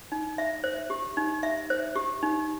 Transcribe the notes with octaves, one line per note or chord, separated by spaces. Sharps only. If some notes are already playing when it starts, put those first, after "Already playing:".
D#4
E5
C5
G4
D#4
E5
C5
G4
D#4